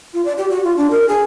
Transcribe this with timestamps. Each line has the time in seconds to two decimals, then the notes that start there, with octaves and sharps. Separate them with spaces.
0.14 F4
0.25 D5
0.38 G4
0.50 F#4
0.64 F4
0.77 D4
0.91 A#4
1.08 G#4